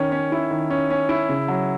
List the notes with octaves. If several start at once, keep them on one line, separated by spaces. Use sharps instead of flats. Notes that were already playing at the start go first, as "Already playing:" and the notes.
Already playing: D#3 C#4
C#4
E4
D#3
C#4
C#4
E4
C#3
F#3